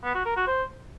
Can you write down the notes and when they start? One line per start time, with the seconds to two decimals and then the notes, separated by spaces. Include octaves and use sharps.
0.03 B3
0.14 F#4
0.25 A#4
0.36 F#4
0.47 C5